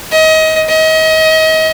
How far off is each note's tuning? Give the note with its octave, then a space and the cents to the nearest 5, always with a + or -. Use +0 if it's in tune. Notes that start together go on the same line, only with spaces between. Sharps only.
D#5 +30
D#5 +35